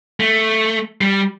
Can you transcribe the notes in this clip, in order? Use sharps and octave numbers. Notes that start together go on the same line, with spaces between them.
A3
G3